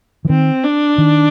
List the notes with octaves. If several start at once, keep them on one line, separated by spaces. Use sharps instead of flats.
E3
D#3 C4
D4
D#3